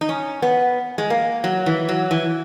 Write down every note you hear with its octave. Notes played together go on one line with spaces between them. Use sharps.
D#4
C#4
B3
G#3
A#3
F#3
E3
F#3
E3